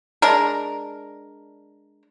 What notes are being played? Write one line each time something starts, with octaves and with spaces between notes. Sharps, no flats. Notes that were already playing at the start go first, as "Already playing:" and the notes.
G#3 D4 A#4